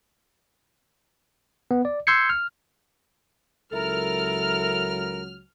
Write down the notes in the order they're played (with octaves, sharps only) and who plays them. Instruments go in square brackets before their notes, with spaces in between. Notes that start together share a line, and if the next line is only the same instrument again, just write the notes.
[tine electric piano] B3
D5
C6 E6 G6 G#6 C7 C#7
F6
[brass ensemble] C#2 F#3 [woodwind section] E4 A4 A#4 [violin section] F6